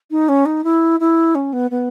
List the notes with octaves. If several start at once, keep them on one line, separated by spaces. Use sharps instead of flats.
D#4
C#4
D#4
E4
E4
C#4
B3
B3